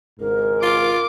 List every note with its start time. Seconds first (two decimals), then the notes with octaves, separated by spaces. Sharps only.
0.20 G#1 C#2 G#2 A#4
0.62 F4 D6